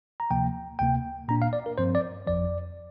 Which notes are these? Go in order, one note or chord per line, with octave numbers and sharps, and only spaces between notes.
A#5
D2 C3 F3 A#3 G5
D2 C3 A#3 G5
A#2 A#3 D4 A#5
F5
D5
A#4
G2 F3 C4 C5
D5
G1 F2 F3 D5